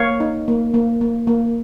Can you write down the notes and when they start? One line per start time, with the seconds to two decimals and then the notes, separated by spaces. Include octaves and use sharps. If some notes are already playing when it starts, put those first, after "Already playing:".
Already playing: A#3 C#5 F5
0.20 D#4
0.48 A#3
0.74 A#3
1.01 A#3
1.27 A#3